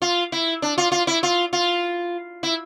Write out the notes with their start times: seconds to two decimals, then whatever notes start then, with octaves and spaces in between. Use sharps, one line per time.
0.02 F4
0.32 E4
0.62 D4
0.78 F4
0.92 F4
1.07 E4
1.23 F4
1.53 F4
2.43 E4